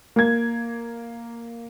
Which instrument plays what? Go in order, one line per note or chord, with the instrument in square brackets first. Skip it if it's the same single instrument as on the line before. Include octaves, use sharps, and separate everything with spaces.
[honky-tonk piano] A#3 G#6